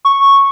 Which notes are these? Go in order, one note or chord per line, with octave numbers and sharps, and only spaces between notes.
C#6